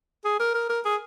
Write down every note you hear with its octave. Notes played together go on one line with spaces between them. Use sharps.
G#4
A#4
A#4
A#4
G#4